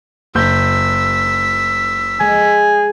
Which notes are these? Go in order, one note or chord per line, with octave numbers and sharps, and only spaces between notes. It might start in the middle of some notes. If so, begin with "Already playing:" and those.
F#1 E6 G6 B6
G#3 G#5